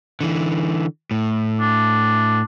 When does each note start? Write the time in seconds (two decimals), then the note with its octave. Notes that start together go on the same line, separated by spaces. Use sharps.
0.21 D3 E3
1.11 A2
1.60 D4